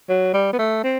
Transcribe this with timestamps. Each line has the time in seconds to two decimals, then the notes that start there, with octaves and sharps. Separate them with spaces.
0.09 F#3
0.34 G3
0.53 B3
0.59 A3
0.84 C4